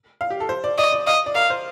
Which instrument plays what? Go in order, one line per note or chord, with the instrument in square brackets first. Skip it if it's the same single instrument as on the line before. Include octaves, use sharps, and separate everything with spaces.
[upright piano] F5
G4
A4
C5
D5
[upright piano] D5 [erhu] D#5
[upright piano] D5
[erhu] D#5 [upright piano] F5
[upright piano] D5
[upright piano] A#4 [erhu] F5
[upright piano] C5